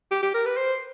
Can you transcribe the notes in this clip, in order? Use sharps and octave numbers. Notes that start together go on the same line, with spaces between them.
G4
G4
A#4
B4
C5